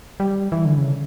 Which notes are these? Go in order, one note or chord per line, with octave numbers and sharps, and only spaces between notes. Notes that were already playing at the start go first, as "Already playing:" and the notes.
G3
E3
D3
C#3